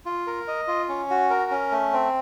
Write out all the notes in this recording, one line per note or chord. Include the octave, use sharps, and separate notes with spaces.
F4
A#4
D#5
F4
C#4
F#4
A#4
C#4
A3
C4